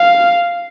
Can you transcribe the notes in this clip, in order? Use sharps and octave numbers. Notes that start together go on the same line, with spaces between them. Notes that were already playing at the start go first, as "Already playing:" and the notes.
Already playing: F5